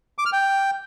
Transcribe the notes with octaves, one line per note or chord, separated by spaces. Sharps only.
D6
F6
G5